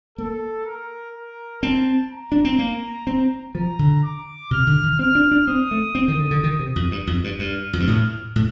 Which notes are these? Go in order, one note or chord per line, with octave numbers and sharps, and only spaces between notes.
A#3 A4
A#4
A#4
C4 A5
A#5
D4
C4
A#3
C4
F3 A#5
D3
D6
C3 F6
D3
D#3
C4 F6
D4
D4
C4 D#6
A3
C4
D#3
D3
D3
D#3
C3
F2
G2
F2
G2
G2 F6
F2
G2
A2
A2